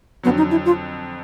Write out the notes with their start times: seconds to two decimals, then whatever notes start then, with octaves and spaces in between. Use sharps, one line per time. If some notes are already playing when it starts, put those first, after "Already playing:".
0.23 F2 D3 F#3 B3
0.37 D#4
0.51 E4
0.65 F4